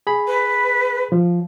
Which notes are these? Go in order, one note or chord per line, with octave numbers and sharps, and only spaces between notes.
G#4 B5
B4
F3